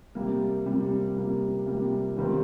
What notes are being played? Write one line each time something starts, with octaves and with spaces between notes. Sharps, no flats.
C3 G3 A#3
C3 G3 A#3
C3 G3 A#3
C3 G3 A#3
D#2 D#3 G3 C4